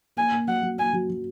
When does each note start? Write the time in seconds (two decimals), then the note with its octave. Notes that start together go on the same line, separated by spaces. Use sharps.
0.17 A#3 G#5
0.32 A#3
0.47 F#3 F#5
0.63 F#3
0.78 A#3 G#5
0.93 F#3
1.10 F#3